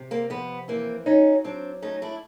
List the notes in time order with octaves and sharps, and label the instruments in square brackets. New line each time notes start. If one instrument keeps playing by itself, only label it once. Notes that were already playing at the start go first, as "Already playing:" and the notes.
Already playing: [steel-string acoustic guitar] C3
A#3 C4
F2 B3
E3 A#3 C4
F#3 C#4 D#4
F#3 C4 D4
A3 C#4 D#4
D4 E4